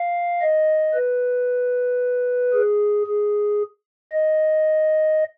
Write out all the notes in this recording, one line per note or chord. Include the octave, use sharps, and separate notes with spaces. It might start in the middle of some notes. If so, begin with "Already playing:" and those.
Already playing: F5
D#5
B4
G#4
G#4
D#5